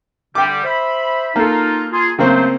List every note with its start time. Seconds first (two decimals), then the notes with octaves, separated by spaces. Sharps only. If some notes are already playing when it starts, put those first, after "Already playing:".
0.35 D3 G3 G5 D6
0.64 C5 E5 B5
1.36 A#3 D#4 F4 A4
1.92 F4 G#4
2.19 C#3 F#3 A3 A#3 C4 C5